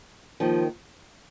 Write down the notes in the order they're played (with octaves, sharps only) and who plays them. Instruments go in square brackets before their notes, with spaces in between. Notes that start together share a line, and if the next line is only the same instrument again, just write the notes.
[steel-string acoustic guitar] D#2 D#3 F3